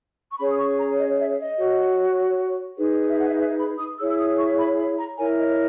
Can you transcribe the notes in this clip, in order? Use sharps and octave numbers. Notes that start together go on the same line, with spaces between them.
C#6
C#4 G#4 C#5 B5
D#6
C#6
A#5
D#5
E5
D#5
F#4 C#5
D#4 G#4 B4
E5
F#5
E5
E5
B5
D#6
E4 G#4 C#5 E6
E6
D#6
C#6
B5
B5
A#5
E4 A#4 C#5 G#5
D#5